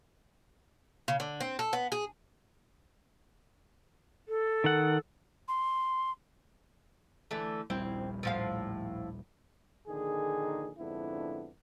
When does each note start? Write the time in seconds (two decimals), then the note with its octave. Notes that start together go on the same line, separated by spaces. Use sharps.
1.08 C#3
1.20 D3
1.41 C4
1.59 A4
1.73 B3
1.92 G#4
4.28 A4
4.64 D#3 F#5
5.48 C6
7.31 D3 E3 A3
7.70 D#1 A#1 G3 C4 E4
8.23 A2 F3 F5
9.88 A#1 D3 D#3 D#4 G#4
10.78 F2 G#2 D3 B3 D4 E4